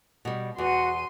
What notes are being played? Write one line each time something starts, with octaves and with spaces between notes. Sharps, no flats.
B2 G3
E2 F#4 F#5 C6 D#7